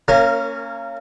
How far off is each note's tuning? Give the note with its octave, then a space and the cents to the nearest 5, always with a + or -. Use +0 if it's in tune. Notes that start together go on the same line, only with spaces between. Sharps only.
A#3 -30 C#4 +0 A#4 +0